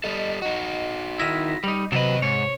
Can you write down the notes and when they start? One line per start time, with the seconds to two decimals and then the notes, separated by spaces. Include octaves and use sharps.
0.04 G3 A4 D#5
0.42 D#4 F#4
1.19 D#3 E4 A#6 B6
1.64 G3 D#4
1.92 D#2 C3 F#3 B4 D#5
2.22 G#2 C#5